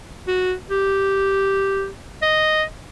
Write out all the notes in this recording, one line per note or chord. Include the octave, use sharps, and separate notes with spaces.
F#4
G4
D#5